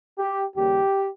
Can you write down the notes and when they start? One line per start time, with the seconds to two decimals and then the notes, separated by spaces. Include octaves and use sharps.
0.19 G4
0.55 D#2 C#3 G3 A#3 G4